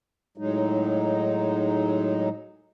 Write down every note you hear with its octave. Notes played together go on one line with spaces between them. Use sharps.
A2 F#3 G#3 D#4